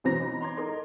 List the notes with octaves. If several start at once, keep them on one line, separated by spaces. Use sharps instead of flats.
F#2 B2 E3 C5 A#5 A#6
D#4 B5
A#5 C6 D6 G#6
D#4 A4 A#4 D#5 C6